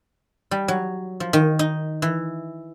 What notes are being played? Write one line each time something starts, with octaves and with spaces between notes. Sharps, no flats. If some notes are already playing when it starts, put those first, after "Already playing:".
G3
F#3
F3
D#3
D#4
E3